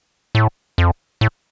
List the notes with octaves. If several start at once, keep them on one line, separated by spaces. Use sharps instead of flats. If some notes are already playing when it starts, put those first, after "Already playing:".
A2
F2
A2